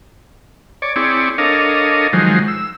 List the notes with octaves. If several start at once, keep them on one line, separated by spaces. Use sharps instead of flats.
C#5 D5
C4 E4 G#4 C#5 D5
D4 A4 A#4 C#5 D#5 F5
D#3 F3 F#3 G#3 C5
E6